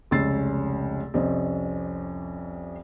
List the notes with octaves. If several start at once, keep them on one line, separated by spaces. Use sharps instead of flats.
F1 C#2 C#4 E6 A6 C7
C2 F2 C#4 C5 D#5